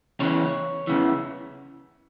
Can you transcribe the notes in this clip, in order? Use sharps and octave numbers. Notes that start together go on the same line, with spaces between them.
E2 C#3 E3 C#5
E2 C#3 E3